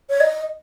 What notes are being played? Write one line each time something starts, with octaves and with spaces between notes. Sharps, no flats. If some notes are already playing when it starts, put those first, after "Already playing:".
C#5
D#5